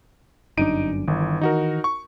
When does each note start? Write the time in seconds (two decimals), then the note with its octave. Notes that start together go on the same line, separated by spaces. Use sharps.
0.57 G1 F#2 D4 D#4 D7 D#7
1.08 G1 D#3 E3
1.41 D#4 F#4 A#4
1.84 C#6